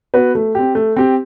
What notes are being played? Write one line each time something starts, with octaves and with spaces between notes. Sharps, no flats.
B3 F#4 B4
A3
C4 G4
A3
C4 G4